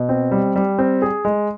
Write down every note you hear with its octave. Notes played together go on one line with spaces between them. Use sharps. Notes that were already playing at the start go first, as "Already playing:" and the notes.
Already playing: B2
C4
G3
G3
C4
G#4
G#3